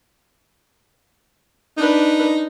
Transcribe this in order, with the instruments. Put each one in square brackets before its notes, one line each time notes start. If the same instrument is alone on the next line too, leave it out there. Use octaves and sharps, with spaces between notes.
[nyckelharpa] D4 B4 [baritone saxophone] D#4